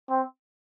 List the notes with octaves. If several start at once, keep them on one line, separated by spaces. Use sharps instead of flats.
C4